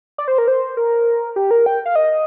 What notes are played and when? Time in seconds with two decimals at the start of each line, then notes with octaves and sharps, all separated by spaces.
0.18 D5
0.28 C5
0.38 A#4
0.48 C5
0.77 A#4
1.36 G4
1.51 A#4
1.66 G5
1.86 F5
1.96 D#5